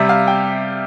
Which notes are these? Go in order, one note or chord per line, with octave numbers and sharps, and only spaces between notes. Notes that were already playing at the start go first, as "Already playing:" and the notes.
Already playing: C3 G3 E5
F5
G5